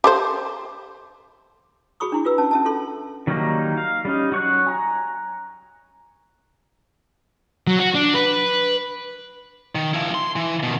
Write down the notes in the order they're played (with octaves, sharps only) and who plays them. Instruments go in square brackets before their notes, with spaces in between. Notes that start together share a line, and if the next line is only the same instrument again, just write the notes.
[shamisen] G4 A4 C5
[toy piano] F#4 G#4 B5 C#6 D#6
D4 E4 F#4
F4 F#4 B4 E6
C#4 A5
C#4 E5 A5
C#4 F4 A4 C6
[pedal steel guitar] D#3 F#3 G3 A#3 D#4
F5
G3 C#4 D#4
F#3 C#6 F#6
G#5 A#5
[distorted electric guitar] F#3
F#4
D4
B4
[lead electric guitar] D#3
F3 E4
C6
E3
B2 D#3